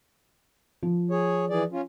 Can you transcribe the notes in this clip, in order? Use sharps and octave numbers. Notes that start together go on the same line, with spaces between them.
F3
G#4 C#5
E3 G#4 D5
C#4 F4